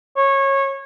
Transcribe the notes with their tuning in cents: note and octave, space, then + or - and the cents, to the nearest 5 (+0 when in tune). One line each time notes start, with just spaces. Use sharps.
C#5 -20